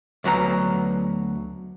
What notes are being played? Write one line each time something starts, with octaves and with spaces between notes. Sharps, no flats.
D2 F#3 B3 A#5